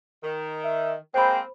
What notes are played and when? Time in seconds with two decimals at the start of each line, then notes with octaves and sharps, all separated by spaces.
0.23 D#3
0.64 E5
1.14 G#3 A#3 C4 C5 G5 B5